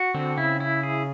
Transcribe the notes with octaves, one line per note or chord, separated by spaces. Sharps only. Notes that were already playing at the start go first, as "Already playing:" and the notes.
Already playing: F#4
D3 C4
C#3 E4
E4
G#4